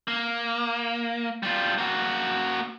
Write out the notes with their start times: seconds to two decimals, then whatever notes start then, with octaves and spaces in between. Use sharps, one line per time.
0.08 A#3
1.43 G3 F4
1.78 A#3 F#4